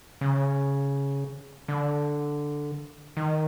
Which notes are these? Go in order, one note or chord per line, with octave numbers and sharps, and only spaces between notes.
C#3
D3
D#3